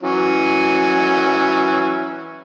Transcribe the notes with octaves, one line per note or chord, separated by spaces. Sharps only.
E3 F#3 C#4